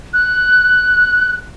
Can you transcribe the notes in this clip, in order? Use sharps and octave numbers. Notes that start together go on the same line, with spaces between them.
F#6